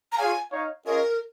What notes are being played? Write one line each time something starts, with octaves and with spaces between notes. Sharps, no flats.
A#5
F4 G#4 C#5 F5 G#5
D#4 C#5 F5
C#4 F4 G#4 A#4 D#5